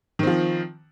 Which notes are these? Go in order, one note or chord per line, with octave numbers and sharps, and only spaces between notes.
D#3 F3 C4